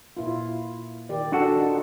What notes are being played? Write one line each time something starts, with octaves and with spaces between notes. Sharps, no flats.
A#2 E4 F4
D#3 G4 D5
D4 F#4 A4
D#4 F4